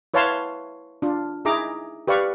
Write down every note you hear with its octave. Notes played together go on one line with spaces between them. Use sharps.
E4 B4 C#5 F5 A5 C6
D4 F4
D#4 E4 G#4 A#5 D6
G4 B4 D5 F5 C#6